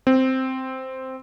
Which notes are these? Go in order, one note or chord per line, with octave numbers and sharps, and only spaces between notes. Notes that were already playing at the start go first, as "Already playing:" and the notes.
C4